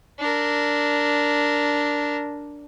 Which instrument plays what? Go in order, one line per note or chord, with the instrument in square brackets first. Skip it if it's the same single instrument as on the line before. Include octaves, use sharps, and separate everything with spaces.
[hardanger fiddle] D4 A#4